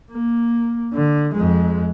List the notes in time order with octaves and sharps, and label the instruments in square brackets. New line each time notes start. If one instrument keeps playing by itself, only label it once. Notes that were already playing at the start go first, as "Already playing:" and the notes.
[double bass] A#3
D3
F2 G#3